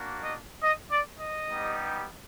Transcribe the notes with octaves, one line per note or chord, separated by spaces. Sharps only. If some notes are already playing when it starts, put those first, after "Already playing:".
Already playing: A#3 D4 F#4
D#5
D#5
D5
D#5
G3 B3 D#4 G4